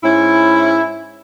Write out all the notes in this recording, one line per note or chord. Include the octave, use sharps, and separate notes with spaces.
G#2 C#4 E4